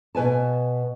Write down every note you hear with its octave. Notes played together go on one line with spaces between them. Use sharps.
B2 B4 G#5 A5